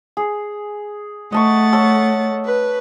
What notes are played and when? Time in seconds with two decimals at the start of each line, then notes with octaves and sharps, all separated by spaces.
0.17 G#4
1.32 A3 D#5 F#5 A5 C#6 A6
1.73 A4 C#5
2.45 B4